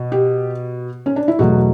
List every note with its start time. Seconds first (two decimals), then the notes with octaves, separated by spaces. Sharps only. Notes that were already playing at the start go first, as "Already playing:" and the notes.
Already playing: B2
0.12 G4
1.06 C#4
1.16 D4
1.28 E4
1.39 E2 B2 F#3 A3 F#4